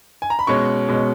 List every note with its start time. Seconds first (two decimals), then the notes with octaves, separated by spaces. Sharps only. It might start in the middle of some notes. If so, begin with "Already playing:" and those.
0.22 G#5
0.30 A#5
0.39 B5
0.47 B2 G#3 C#4 C#6
0.89 B2 G#3 C#4